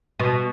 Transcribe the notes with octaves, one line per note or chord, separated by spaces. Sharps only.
B2